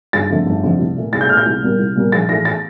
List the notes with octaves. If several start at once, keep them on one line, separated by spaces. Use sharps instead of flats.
G1 A6
F2 D3 A3
G1
F2 D3 A3
C2
A#2 A3
C2 A6
G6
A#2 A3 F6
G6
C2
A#2 G3 A#3
C2
A#2 G3 A#3
A#1 A6
A2 E3 A3 A#6
A6